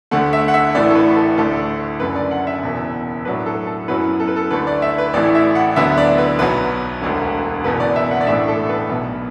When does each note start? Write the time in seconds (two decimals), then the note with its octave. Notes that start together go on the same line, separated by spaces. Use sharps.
0.11 D2 D3 A3 F#5
0.33 E5
0.48 F#5
0.54 E5
0.75 A1 A2 A3 E4 D5
0.90 A4
0.95 B4
1.16 A4
1.38 D2 D3 A3 D4 A4
2.00 F#1 F#2 D3 B4
2.16 D5
2.31 F#5
2.47 E5
2.63 F#1 E2 B2
3.25 A2 F#3 D4 B4
3.46 A4
3.67 A4
3.88 F#2 F#3 B3 E4 B4
4.20 A4
4.27 B4
4.36 A4
4.50 D2 D3 A3 B4
4.67 D5
4.82 E5
4.98 B4
5.13 A1 A2 E3 A3 E4 D5
5.35 E5
5.55 F#5
5.76 D2 D3 F#3 B3 E5
5.98 D5
6.18 B4
6.39 B1 B2 F#3 B3 B4
7.02 E1 D2 D3
7.64 F#1 E2 B2 B3 B4
7.80 D5
7.96 E5
8.11 F#5
8.21 D5
8.27 A1 A2 A3 D4 E5
8.48 A4
8.69 B4
8.89 B1 B2 B3